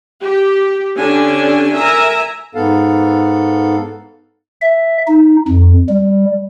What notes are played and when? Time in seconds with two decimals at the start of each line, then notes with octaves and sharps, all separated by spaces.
0.21 G4
0.98 D3 C#4 D4 G4 G#5
1.76 A#4 E5 G#5 A#5
2.55 G#2 B3 A4 F5
4.61 E5
5.07 D#4
5.48 F2
5.89 G3